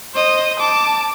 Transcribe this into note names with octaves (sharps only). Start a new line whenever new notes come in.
C5 D#5
A5 D6